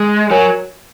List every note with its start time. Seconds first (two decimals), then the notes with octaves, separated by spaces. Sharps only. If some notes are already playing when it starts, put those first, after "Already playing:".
Already playing: G#3
0.30 F#3 A#4 C#5 G#5